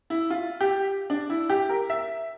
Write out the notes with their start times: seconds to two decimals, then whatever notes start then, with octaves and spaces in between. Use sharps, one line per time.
0.10 E4
0.30 F4
0.61 G4
1.10 D4
1.30 E4
1.50 G4
1.69 A#4
1.90 E5